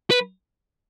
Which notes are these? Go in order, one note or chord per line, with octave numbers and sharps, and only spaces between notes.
B4